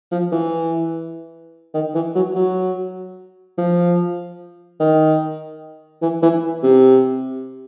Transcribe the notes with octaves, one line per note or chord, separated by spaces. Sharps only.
F3
E3
D#3
E3
F#3
F#3
F3
D#3
E3
E3
C3